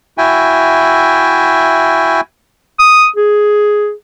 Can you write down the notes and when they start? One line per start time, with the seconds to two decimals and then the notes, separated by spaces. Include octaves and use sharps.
0.18 E4 F#4 E5 G5 G#5
2.79 D#6
3.16 G#4